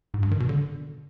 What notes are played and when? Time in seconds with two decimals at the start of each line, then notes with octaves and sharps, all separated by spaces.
0.14 G#2
0.23 G2
0.31 D#3
0.40 B2
0.49 D3